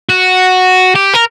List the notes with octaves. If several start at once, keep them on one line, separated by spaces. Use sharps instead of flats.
F#4
G4
A#4